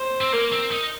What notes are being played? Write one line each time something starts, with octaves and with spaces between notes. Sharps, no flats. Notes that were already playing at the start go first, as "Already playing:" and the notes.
Already playing: C5
C4
A#3 A#4
C4
D#4